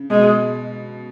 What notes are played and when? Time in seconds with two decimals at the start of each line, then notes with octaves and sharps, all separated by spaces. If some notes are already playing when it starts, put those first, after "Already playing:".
Already playing: C#3
0.10 B2 G#3